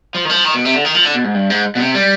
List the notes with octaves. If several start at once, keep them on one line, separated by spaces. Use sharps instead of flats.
F3
D#3
F3
D#3
B2
C3
D3
D#3
F3
D3
B2
G#2
G2
G#2
B2
C3
G3